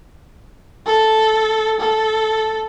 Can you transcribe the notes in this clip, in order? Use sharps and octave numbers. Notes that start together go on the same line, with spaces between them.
A4
A4